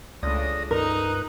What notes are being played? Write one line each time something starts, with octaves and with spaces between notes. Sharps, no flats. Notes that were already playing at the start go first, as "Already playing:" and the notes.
C#2 A3 D4 D5 D#6 A#6
G2 D#4 A#4 B4 A#5 F#6